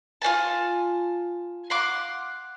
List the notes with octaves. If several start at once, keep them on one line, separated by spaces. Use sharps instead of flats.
F4 D5 G#5 A5
F5 F#5 C6 D6